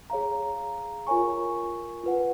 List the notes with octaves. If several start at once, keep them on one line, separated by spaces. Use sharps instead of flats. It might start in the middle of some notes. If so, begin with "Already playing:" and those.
G#4 C#5 F5 A#5
F4 A#4 C#5 G#5 C#6
F4 B4 F#5